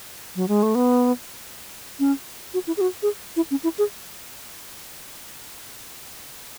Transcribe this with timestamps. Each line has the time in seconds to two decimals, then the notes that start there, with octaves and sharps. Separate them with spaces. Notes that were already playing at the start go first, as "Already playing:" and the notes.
0.36 F#3
0.48 G#3
0.63 A3
0.75 B3
2.00 C#4
2.54 F#4
2.67 E4
2.77 G#4
2.81 F#4
3.03 G#4
3.36 E4
3.51 C#4
3.64 E4
3.78 G#4